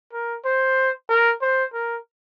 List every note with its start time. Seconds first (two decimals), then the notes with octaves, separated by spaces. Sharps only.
0.13 A#4
0.45 C5
1.09 A#4
1.42 C5
1.74 A#4